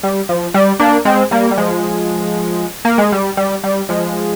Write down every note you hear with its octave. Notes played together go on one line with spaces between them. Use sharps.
G3
F3
G3
A#3 D4
G#3 C4
G3 A#3
G3
F3 G#3
A#3
G#3
G3
G3
G3
F3 G#3